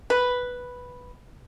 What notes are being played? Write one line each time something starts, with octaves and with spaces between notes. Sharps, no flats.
B4